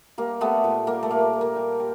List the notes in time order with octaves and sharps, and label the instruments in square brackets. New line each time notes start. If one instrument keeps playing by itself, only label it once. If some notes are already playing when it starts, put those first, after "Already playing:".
[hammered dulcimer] G3 A#3
G3 A3 B3
A#2
G3 A#3
A3
A#2 A#3
A#2
A#3
G3
G3